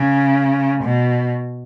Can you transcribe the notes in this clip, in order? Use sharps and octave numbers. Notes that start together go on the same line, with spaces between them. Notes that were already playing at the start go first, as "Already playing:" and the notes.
Already playing: C#3
B2